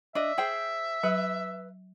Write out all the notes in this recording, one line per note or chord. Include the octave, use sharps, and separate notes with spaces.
D4 D#5 E5
G#4 C5 G5
F#3 B4